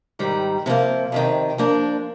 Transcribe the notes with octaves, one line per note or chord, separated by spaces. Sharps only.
G#2 D#3 G3
C3 F3 A#3
F2 C3 D#3
F3 A#3 D4